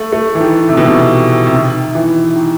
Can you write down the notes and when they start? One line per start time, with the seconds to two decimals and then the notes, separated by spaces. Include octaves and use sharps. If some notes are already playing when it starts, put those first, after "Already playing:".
Already playing: A3
0.13 A3
0.35 E3
0.41 D#3
0.69 C3
0.77 B2
0.86 C3
1.47 C3
1.53 D#3
1.95 E3
2.36 D#3